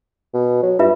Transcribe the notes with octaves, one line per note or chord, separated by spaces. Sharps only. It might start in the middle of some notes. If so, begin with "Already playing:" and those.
B2
F#3
G2 F4 B4 E5